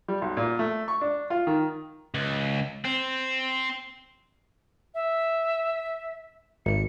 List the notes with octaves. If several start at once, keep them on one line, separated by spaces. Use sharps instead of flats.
G3
B1
A#2
A3
C#6
D4
F4
D#3
C#2
C4
E5
G#1 C#7